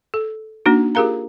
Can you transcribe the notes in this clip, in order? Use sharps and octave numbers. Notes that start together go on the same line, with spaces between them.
A4
A#3 D4 D#4 F#4
F4 G4 G#4 A#4 F5 A#5